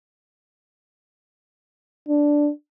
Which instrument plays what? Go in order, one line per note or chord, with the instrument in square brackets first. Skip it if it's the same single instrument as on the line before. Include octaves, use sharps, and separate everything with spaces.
[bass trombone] D4